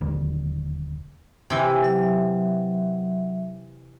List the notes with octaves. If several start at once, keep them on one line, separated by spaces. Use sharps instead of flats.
E1 D#2 D3
C3 E3 G#5 E6
F#3 E5